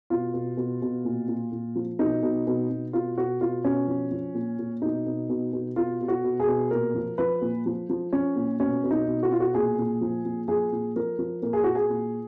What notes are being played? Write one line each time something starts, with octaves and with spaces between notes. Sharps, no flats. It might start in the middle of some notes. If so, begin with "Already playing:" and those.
B2 F4
B2
B2
B2
A#2
A#2
A#2
F3
B2 D#4
B2
B2
B2
B2 F4
B2 F#4
B2 F4
B2 C#4
F3
F3
A#2
A#2
B2 D#4
B2
B2
B2
B2 F4
B2
F#4
B2
G#4
B2
A#2 A#4
F3
F3 B4
A#2
F3
F3
F3 C#4
A#2
B2 C#4
B2
D#4
B2
F#4
B2 F4
F#4
A#2 G#4
A#2
F3
A#2
F3 G#4
A#2
F3 A#4
F3
A#2 A#4
G#4
A#2 F#4
G#4
A#2